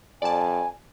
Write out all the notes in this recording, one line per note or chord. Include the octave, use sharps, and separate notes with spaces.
F2 D5 G#5 A5